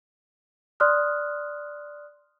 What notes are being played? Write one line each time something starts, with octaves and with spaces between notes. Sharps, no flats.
D5 C6 D#6 F6 F#6